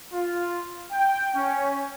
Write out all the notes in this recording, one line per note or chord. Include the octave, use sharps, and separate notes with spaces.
F4
G5
C#4